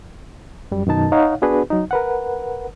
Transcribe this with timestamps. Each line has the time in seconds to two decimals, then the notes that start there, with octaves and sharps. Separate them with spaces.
0.71 F#2 G3
0.87 F#2 B2 D#3 D#4 A5
1.12 D#4 C#5 F5 F#5
1.42 B3 D4 F#4 G#4 B4
1.70 F#3 D#4
1.91 A#4 B4 F#5